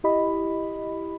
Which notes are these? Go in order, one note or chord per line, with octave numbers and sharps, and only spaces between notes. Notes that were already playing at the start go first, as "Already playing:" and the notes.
E4 G4 D#5 B5